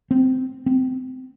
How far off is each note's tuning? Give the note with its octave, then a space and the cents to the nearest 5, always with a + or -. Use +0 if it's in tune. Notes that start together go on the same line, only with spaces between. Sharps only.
C4 -15
C4 -25